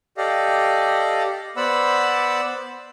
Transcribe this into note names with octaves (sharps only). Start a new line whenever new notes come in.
G4 A4 D5 D#5 F5
B3 C5 D5 F#5 B5 E6